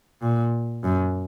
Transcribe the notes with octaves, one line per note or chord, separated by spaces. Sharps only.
A#2
F#2